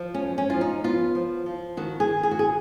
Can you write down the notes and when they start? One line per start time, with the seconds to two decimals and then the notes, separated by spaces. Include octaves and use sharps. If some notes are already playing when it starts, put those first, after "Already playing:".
Already playing: F3
0.14 C#4
0.22 F#2
0.38 C#4
0.50 F3 F4
0.61 D#4
0.84 B3 F4
1.15 F3
1.46 F3
1.77 D#3 F#4
2.00 G#4
2.08 D#3
2.23 G#4
2.31 F#4
2.39 G#4